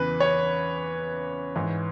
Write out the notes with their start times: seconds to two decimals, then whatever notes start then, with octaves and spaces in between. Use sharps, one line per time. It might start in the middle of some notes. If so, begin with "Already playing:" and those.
Already playing: E2 C#3 E3 B4
0.20 C#5
1.56 G#2 E3